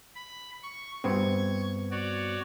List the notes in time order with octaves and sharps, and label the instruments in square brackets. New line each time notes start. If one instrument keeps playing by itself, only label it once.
[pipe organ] B5
C#6
[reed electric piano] G2 B3 C4 [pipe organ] C#6 G#6
[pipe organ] F#4 C#5 D5